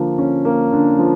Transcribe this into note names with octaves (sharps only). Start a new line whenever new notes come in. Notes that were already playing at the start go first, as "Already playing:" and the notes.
Already playing: D3 F3 A#3
C#4
A#3
D3
F3